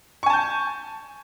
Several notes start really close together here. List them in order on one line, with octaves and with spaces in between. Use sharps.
C#6 G#5 A5 G6